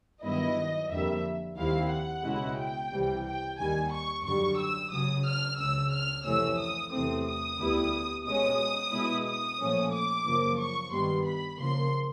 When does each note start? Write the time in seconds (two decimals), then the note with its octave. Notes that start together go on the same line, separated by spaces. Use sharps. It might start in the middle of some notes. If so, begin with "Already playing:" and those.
0.24 G2 D#3 F#3 B3 E4 D#5
0.90 F2 D3 G3 A#3 E5
1.57 D#2 D#3 G3 C4 E4 F5
1.91 F#5
2.24 C#2 B2 G#3 C#4 E4
2.58 G5
2.91 C2 C3 E3 G3
3.24 G5
3.58 D#2 D#3 G3 G#5
3.91 C#6
4.24 F#2 D3 G3 C#6
4.58 E6
4.91 F#2 C#3 F#3 D#6
5.25 F6
5.58 C#2 C#3 F#3 E6
5.91 F6
6.25 F2 C3 E3 A3 C#4 E6
6.58 D#6
6.92 E2 C3 E3 A3 C4 D#6
7.25 D#6
7.59 D2 D3 G3 B3 E4
8.25 B2 G#3 C#4 D#6
8.92 B2 G#3 B3 E4
9.25 D#6
9.59 A#2 F3 A3 C#4
9.92 D6
10.25 F#2 C#3 F3 A#3
10.59 C#6
10.92 G2 D#3 G3 B3 C6
11.25 B5
11.59 C#3 F3 A#3 C6